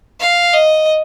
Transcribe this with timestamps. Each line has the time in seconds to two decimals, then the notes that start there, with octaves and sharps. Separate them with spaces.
0.20 F5
0.53 D#5